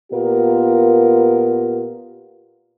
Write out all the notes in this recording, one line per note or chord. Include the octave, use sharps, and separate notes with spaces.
A#2 B3 F4 G4 A#4